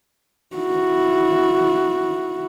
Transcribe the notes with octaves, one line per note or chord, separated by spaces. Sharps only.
E4 F#4